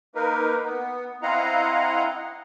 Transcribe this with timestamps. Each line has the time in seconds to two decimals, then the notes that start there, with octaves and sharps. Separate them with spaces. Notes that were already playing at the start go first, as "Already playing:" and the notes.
0.15 A#3 D#4 A#4 B4
0.63 B3
1.22 C4 E4 D#5 F5 F#5 A#5